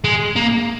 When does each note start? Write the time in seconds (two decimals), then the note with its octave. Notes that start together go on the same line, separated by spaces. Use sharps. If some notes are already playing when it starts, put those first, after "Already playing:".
0.05 G#3
0.36 A#3